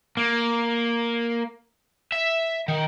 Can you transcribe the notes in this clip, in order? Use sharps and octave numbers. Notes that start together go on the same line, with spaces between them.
A#3
E5
D#3